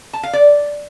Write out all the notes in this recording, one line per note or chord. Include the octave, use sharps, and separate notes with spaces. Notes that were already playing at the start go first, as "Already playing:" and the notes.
A5
F5
D5